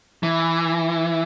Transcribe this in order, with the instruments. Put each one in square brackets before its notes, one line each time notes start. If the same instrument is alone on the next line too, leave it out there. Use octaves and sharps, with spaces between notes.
[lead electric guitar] E3